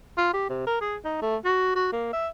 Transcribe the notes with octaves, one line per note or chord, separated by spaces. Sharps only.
F4
G4
C3
A#4
G#4
D#4
A3
F#4
F#4
A#3
E5